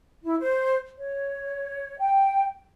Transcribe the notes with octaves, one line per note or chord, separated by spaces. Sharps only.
E4
C5
C#5
G5